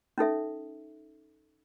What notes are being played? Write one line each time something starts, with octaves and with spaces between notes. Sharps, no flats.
C#4 D#4 A4 E5